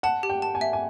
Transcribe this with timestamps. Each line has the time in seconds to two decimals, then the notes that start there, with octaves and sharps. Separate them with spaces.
0.03 F#5 A5
0.23 G4
0.30 G5
0.42 A5
0.55 G#5
0.61 E5
0.73 G#5